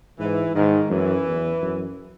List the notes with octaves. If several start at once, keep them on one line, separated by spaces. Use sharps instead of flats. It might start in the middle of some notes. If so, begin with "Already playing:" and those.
G#2 E3
G#2 D#3
F#2 E3
E2
F#2